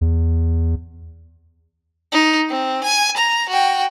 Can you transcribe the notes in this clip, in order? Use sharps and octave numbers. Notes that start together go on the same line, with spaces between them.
E2
D#4
C4
G#5
A#5
F#4 G5